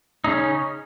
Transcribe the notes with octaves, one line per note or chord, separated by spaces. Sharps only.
C#3 C#4 D#4